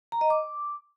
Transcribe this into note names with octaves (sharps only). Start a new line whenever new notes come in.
A#5
D#5
D6